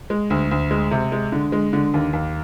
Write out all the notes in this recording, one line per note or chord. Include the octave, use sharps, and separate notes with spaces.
G#3
D2
D2
G#3
C3
G#3
D3
G#3
D3
D#2
D#2